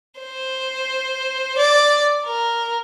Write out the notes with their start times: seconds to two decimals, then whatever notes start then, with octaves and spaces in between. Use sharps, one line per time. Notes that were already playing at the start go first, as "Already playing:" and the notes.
0.20 C5
1.58 D5
2.25 A#4